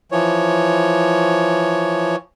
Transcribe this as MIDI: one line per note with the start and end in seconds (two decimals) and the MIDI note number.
0.12 2.16 52
0.12 2.16 53
0.12 2.16 73